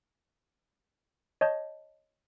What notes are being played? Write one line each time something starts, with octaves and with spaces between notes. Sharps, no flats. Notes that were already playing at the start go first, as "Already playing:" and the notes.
C#5 D#5 A5 G6